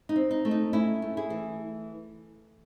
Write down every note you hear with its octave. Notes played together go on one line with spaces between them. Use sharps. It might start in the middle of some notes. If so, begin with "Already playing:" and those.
D#4
C4
D#4
A3
D#4
A3 C#4 E4
A3
E4 G#4
E3